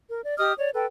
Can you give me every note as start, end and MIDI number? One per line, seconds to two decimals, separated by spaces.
0.10 0.21 70
0.24 0.37 74
0.37 0.53 67
0.37 0.53 75
0.37 0.53 87
0.37 0.53 89
0.58 0.70 73
0.58 0.70 74
0.74 0.86 69
0.74 0.86 71
0.74 0.86 79